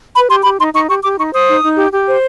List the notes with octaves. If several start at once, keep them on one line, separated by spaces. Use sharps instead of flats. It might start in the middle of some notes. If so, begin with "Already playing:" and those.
B4 B5
G4 C6
G4 B5
D#4 C6
D#4 C#6
G4 C#6
G4 D6
D#4 C#6
C5 D#6
D#4
D#4
G4
G4
C5